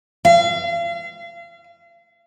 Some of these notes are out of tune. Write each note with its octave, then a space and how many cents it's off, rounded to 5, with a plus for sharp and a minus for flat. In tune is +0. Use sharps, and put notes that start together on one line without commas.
F5 -40